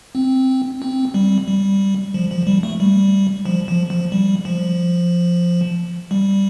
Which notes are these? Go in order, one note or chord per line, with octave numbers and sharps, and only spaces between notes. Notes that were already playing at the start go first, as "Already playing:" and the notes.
C4
C4
G3
G3
F3
F3
G3
A3
G3
F3
F3
F3
G3
F3
G3